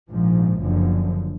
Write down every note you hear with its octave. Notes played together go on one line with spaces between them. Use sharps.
A#1 G#2 F3
F#1 F#2 D3 F3